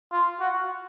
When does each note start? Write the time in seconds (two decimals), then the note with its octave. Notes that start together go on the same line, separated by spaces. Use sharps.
0.12 F4
0.40 F#4